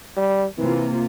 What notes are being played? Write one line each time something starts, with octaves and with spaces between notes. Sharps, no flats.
G3
C3 E3 A#3 F4